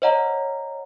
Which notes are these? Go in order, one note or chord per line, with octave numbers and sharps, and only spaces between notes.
C5 C#5 D#5 F#5 A#5